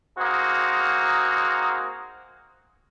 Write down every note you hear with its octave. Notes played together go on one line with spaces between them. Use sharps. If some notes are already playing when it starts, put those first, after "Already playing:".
A#3 C4 D#4 F#4 G#4